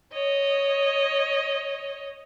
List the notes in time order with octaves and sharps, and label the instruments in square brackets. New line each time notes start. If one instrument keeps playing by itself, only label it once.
[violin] C#5 D#5